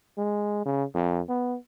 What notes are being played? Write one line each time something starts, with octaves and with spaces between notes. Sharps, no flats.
G#3
C#3
F2
B3